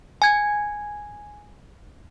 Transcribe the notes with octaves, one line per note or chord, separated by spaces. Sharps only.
G#5 G#6